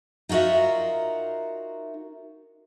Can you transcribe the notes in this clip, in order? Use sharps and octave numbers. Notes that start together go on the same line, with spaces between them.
D#4 F4 F#4 A#4 E5